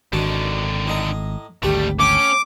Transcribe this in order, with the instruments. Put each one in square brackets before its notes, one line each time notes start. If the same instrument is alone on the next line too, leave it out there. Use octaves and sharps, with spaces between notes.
[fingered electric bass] G#1 [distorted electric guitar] D3 D#3 [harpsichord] D4 F#4
[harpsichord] A2 D#5 A#5
[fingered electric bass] G#1 D2 [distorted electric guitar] G3 A3 [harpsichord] G4 B4
[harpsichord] A3 G5 [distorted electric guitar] C#4 [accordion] D6